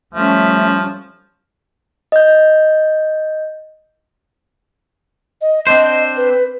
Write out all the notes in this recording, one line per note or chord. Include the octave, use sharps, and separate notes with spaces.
F3 G3 A3 C#4 E5
D#5 G6
D#5
C4 D4 C5 D#5
B4